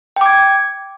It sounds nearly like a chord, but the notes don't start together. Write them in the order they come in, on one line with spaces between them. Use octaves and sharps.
G5 D6 G#6